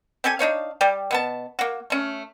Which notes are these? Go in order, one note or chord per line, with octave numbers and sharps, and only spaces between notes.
C4 G4 A4 G#5
D4 D#4 C#5 F5
G3 G4 D5
B2 B3 A5
A#3 F#4
A3 C#4